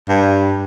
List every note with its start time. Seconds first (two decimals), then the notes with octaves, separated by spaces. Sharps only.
0.09 G2